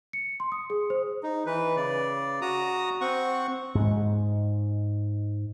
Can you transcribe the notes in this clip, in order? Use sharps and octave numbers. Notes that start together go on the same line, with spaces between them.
C#7
C6
D#6
G#4
C5
D#4
E3 B4
C#3 D5
F#4 A#5 D#6
C4 F#5 C#6
G#2 G#3